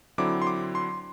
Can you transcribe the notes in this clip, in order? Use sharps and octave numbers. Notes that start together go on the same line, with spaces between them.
D3 F#3 C4 E4 D6
C6
D6
C6